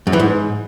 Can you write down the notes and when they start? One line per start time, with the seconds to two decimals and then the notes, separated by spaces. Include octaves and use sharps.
0.07 F#2
0.13 E3
0.20 G#2